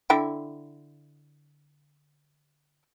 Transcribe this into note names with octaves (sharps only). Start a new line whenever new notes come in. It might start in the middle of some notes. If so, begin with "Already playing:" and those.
D3 E4 G5